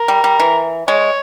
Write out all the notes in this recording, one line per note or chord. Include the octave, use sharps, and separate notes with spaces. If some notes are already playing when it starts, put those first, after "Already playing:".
Already playing: A#4
G3
G3
E3
G#3 C#5